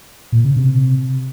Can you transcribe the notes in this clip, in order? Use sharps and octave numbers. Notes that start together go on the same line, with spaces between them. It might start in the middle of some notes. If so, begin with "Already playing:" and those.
A#2
C#3
C3